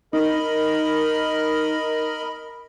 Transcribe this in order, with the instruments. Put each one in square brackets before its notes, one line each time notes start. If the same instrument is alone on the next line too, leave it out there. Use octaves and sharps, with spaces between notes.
[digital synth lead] D#4 [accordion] A#4 D#5 B5